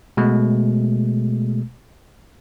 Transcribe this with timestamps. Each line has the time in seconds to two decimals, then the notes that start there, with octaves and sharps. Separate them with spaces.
0.17 B2 G#3 A3